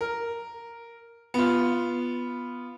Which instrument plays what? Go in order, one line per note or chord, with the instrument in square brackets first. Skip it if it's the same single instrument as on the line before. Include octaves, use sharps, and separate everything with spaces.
[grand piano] A#4
B3 F4